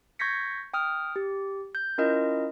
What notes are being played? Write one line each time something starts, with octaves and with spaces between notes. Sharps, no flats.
C#6 G6 G#6 A#6 B6 C#7
G5 D#6 F6
G4
G6
C#4 E4 F4 A#4 D#5